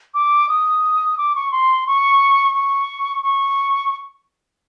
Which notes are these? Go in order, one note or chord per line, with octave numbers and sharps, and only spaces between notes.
D6
D#6
D6
C#6
C6
C#6
C#6
C#6